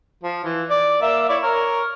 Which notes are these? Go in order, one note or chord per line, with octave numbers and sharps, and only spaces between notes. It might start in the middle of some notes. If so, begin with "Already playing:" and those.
F3
E3
D5
A#3 E5 E6
E4 C#5 D5
A#4 C#5